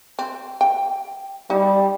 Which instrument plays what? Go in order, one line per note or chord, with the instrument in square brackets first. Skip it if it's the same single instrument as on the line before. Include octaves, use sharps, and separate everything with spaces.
[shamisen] C4
G5
[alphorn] G3 [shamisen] D#4